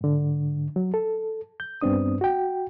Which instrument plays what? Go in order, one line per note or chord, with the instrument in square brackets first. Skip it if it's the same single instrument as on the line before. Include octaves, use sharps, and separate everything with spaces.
[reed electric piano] G#2 D3
F#3
A4
G6
G2 B3 C4 D4 D#6
F#4 G5